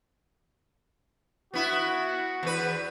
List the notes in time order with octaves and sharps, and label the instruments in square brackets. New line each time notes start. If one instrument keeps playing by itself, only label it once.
[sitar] B3 E4 [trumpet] F#4
[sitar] E2 B4